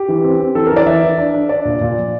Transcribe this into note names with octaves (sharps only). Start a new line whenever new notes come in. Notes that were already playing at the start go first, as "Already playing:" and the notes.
Already playing: G4
E3
C4
C4
E3 A4
A#4
E3 D5
E3 E5
E3
D4
D4
D4 D5
A#2
A#2
F3